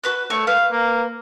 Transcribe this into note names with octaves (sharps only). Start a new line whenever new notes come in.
F#4 B4 F#6
A3 C#5
B4 F5
A#3